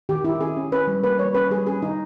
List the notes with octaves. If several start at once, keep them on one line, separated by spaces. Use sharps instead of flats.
D#3 G4
D#3 E4
C#4 G#4
C#4
C#4 B4
G3
A#3 B4
G3 C#5
C#4 B4
G3 G#4
C#4 G#4
D#3 D#4